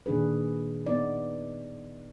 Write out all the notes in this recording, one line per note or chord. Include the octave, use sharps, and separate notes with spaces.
A#2 D#3 D4 G#4 B4
B3 D#4 D5